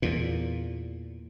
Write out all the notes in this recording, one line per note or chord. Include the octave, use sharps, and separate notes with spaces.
E2 A#2